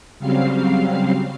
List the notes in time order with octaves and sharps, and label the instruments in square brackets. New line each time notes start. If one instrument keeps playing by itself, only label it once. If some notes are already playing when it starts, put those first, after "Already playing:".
[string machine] C#3 F#3 G3 C4 F5 C7